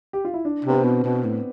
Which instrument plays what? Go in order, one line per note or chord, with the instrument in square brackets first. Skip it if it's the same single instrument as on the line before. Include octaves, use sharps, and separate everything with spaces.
[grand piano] G4
F4
E4
D4
[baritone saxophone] C3
[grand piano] B3
C4
[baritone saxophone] B2
B2
A2